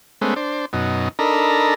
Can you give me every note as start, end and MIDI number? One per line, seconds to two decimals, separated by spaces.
0.21 0.34 56
0.21 0.34 57
0.21 0.34 59
0.21 0.34 61
0.21 0.34 72
0.36 0.66 62
0.36 0.66 72
0.73 1.09 42
0.73 1.09 47
0.73 1.09 63
1.19 1.74 62
1.19 1.74 63
1.19 1.74 69
1.19 1.74 70
1.19 1.74 82
1.19 1.74 83